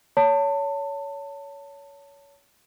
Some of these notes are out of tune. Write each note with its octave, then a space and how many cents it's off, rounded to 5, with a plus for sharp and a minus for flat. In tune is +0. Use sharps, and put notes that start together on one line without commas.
C#5 +25 A5 +25